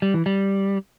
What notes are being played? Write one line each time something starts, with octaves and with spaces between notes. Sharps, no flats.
G3
E3
G3